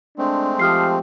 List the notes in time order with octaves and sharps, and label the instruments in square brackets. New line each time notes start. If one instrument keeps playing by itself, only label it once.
[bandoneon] G#3 A3 C4 [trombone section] D4
[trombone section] F3 G4 [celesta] D#6 F6 C7